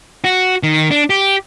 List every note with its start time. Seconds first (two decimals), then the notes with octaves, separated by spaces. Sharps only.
0.24 F#4
0.63 D#3
0.91 D4
1.10 G4